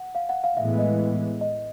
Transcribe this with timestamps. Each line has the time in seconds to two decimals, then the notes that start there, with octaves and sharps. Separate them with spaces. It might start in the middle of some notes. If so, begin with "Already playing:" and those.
Already playing: F#5
0.15 F5
0.29 F#5
0.44 F5
0.57 A2 E3 G#3 B3 E5
0.79 D#5
1.41 D#5